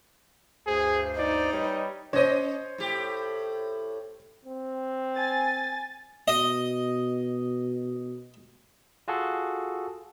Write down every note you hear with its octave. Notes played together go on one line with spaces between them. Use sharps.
D2 G2 G#4 C5
D#4 D5
G3 B4 C#5
C#4 C5 C#5 D#5
A2 G4
C4
G#5 A6
B2 D#5
F4 F#4 G#4 A4